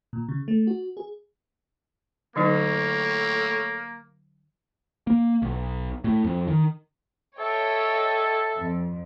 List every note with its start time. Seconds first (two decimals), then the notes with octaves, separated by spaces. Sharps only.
0.13 A#2
0.29 C#3
0.48 A3
0.67 F#4
0.97 G#4
2.36 D3 F#3 A3 A#3 D#4 C#5
5.07 A#3
5.42 B1
6.04 A2
6.24 F2
6.48 D#3
7.39 A4 C#5 D#5 E5 G5
8.56 F2